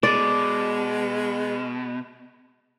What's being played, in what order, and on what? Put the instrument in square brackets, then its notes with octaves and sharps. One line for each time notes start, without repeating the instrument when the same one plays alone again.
[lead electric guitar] B2 [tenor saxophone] G#3 [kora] D5